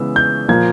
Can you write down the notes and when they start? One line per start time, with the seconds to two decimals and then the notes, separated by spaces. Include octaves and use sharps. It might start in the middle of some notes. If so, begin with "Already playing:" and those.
Already playing: C#3 E3 G#3 B3 E6
0.16 G6
0.49 A#2 F3 A#3 G#6